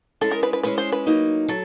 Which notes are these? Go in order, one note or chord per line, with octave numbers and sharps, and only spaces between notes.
G#3 C#4 E4 G#4 A4
A#4
B4
B4
G#3 C#4 E4 G#4 B4
C5
B4
F#3 A#3 D#4
F#3 A4